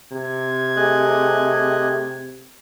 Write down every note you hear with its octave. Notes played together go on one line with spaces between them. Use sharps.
C3 G#6
A3 G4 G#4 D#5 F#6